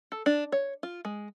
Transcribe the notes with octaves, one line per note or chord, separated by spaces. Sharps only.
A4
D4
C#5
F4
G#3